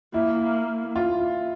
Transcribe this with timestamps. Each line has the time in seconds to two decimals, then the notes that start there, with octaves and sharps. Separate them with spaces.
0.13 A#3 E4
0.96 F4